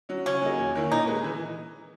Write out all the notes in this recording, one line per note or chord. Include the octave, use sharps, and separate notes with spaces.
F#3 C#4
C#3 C#4
F#3 A#3 D#4 G#4
E2
D#3 A#3 C#4 E4
A#2 D#4
G#3 D#4 G#4 B4
E3